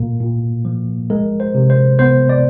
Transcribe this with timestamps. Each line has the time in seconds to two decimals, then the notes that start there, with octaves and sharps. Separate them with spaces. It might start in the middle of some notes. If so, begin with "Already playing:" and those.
Already playing: A#2 A#3
0.21 A#2
0.65 F3
1.10 G#3 A#4
1.40 C5
1.54 C3
1.70 C5
1.99 B3 C5
2.29 D5